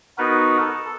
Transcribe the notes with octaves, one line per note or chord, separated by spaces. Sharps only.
B3 D#4 F#4 A#4 B4
A4